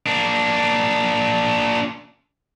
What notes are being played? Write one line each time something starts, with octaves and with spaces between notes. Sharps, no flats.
A#3 D4